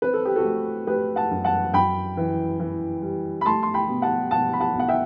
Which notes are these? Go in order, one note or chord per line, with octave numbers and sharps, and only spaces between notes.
C4 B4
A4
G4
F#4 A4
A3
A3 G4 B4
F#5 A5
F#2
F#5 A5
F#2 G5 B5
E3
E3
G3
B5
A3 A5 C6
C6
G5 B5
B2
F#5 A5
B2 F#5 A5
B5
F#5 A5
B1 F#5
E5 G5